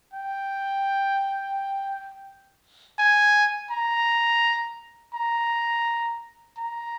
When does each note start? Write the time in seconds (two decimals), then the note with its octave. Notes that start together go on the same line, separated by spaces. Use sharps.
0.13 G5
2.98 G#5
3.71 A#5
5.14 A#5
6.57 A#5